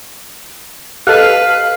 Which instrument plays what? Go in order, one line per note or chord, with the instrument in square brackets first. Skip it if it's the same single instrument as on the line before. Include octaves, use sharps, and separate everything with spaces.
[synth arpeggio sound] G4 A4 [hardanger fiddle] B4 [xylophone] D#5 F6 F#6 [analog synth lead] F5